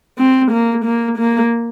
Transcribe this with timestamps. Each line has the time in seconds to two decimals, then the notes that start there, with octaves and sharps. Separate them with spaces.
0.18 C4
0.51 A#3
0.85 A#3
1.18 A#3